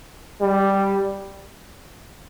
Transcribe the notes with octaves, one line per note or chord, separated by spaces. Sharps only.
G3